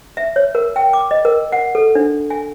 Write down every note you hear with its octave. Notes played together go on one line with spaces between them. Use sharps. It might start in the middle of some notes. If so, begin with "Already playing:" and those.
E5
C#5
A#4
G5
D6
D#5
A#4
F#5
A4
D4
G#5